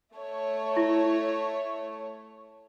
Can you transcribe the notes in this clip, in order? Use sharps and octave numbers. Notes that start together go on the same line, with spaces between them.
A3 C#5
E4